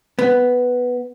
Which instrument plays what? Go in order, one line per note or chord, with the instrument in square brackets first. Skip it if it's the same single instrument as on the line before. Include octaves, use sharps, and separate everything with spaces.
[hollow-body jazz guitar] B3